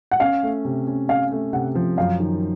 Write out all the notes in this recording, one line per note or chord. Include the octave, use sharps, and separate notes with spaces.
F#5
C#4 F5
A3
C3
C#4
C#4 F5
A3
C3 F#5
F3
F#2 F5
D#3